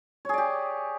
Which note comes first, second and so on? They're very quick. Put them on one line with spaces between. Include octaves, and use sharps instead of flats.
C#5 G#4 D5 G4